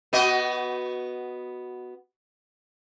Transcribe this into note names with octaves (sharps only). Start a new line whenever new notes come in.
B3 F#4 D#5